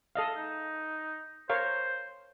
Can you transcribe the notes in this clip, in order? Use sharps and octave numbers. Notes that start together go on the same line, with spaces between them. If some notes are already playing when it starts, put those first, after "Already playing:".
A4 D#5 F5
D#4
A#4 C5 C#5 F5